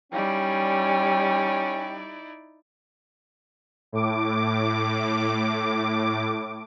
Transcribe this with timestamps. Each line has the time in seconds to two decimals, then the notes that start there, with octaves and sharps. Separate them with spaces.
0.12 G3 C#4 D#4 E4 D5 G5
3.92 A2 D6